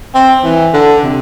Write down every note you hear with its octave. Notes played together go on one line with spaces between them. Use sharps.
C4
E3
D3
C3